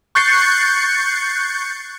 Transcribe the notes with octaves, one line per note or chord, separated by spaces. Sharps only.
C#6 F#6 G6 A6 C7 C#7